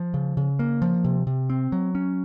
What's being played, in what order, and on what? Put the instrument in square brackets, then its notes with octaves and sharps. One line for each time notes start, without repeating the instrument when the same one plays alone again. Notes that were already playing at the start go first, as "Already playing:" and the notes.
Already playing: [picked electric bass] F3
C#3
C#3
A#3
F3
C3
C3
C4
F#3
C#4